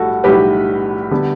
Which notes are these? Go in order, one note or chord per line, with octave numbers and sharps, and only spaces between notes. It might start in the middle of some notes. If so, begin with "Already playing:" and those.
Already playing: B1 A2 G3 F#4 A4
B1 A2 G3 G4 B4
D3 G3 B3